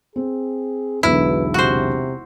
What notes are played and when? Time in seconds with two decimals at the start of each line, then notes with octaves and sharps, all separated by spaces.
0.16 C4 G#4
1.03 E1 B1 D3 E4 B4
1.54 C3 F#4 C5